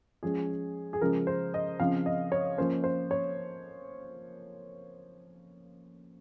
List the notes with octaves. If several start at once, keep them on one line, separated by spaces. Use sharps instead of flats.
F3 G#3 C#4 G#4
G#4
C#3 F3 G#3 A#4
C5
D#5
C#3 F3 C4 F5
D#5
C#5
F3 A#3 C#4 C5
C5
C#5